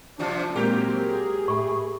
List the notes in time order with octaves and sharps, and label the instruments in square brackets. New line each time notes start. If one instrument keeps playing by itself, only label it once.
[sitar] C3 E3 F4 [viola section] D4
[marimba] A#2 G#3 G6 [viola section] F#3 A#3 C4 [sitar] G4 [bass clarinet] A#4
[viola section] G#4
[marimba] A2 B5 [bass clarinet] A3